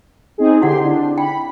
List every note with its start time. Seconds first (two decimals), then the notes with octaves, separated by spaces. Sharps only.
0.38 C4 D#4 G#4
0.62 D3 E4 G4 F#5 C6
0.83 D4
1.18 G5 B5